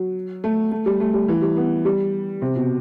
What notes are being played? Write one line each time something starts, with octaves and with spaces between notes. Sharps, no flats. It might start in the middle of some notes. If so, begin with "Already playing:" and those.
Already playing: F#3
A3
A3
G3
A3
G3
E3
G3
B3
G3
C3
B2